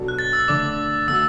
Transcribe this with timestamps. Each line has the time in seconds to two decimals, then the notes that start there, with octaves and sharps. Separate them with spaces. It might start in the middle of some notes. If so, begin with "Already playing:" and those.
Already playing: B2 F#3 D4 A4
0.08 F#6
0.19 A6
0.33 E6
0.48 D3 A3 D4 D6
1.08 D3 A3 F#4 E6